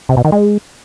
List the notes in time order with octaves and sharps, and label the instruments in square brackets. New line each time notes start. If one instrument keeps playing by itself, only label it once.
[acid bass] C3
B2
D#3
G#3